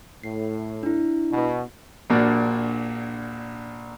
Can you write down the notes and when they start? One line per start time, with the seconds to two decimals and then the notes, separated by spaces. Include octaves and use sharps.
0.23 A2 C7
0.83 D4 E4
1.32 B2
2.10 A#1 A#2 A#3 D4 F#4